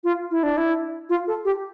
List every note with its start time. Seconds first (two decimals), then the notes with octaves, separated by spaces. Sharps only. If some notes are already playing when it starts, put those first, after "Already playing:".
0.04 F4
0.31 E4
0.43 D4
0.57 E4
1.09 F4
1.27 A4
1.45 G4